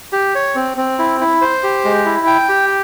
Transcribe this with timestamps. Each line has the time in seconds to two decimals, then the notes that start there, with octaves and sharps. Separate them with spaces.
0.13 G4
0.35 C#5
0.55 C4
0.77 C4
0.99 E4
1.20 E4
1.41 C5
1.63 G4
1.85 G#3
2.06 E4
2.27 G5
2.49 G4